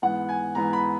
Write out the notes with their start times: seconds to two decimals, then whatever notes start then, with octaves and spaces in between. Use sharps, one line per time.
0.02 G#2 E3 B3 F#5
0.29 G#5
0.55 G#2 E3 B3 A#5
0.73 B5